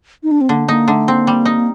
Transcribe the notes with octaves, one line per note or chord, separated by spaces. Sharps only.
D#4
D4
C4
D3 A#3
A#3 D#4
D3 A3
A#3 C4
G3
D#4